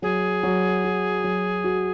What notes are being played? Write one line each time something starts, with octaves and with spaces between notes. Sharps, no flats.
F#3 G#4
F#3
F#4
F#3
F#4